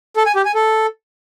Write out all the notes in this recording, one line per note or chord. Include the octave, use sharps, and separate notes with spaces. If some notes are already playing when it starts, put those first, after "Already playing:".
A4
G#5
G4
G#5
A4